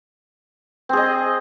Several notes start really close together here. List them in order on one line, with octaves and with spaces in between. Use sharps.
C4 G#4 D#5